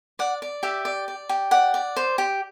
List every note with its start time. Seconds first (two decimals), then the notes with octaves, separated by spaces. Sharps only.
0.19 D5 F#5
0.42 D5
0.63 G4 E5
0.85 D5
1.08 D5
1.29 G4
1.51 D5 F#5
1.74 D5
1.96 C5
2.18 G4